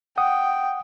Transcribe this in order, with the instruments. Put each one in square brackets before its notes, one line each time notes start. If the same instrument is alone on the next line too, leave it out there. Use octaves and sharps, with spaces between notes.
[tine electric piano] F#5 D#6 [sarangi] G5